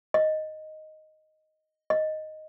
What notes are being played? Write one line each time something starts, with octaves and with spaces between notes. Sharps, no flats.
D#5
D#5